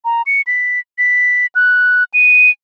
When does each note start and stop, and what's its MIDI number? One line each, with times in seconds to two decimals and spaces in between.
0.05 0.22 82
0.26 0.41 97
0.47 0.79 95
0.98 1.46 95
1.55 2.04 90
2.14 2.50 99